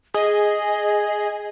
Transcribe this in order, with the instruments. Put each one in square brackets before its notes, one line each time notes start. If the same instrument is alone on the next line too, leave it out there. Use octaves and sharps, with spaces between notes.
[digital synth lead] G#4 [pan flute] D#5